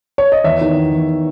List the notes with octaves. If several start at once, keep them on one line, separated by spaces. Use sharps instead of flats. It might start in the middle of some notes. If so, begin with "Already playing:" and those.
C#5
D#5
E2 C#5 E5
D#3
E2
E2